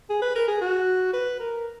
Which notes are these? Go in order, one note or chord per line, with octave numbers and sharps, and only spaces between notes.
G#4
B4
A#4
G#4
F#4
B4
A#4